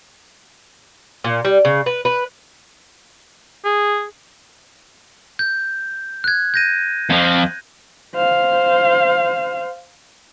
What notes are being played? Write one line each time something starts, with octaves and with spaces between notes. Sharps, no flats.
A#2
G3
C#3
B4
B4
G#4
G6
F#6 G#6
G6 A#6 D#7
F2 F3
C5 F5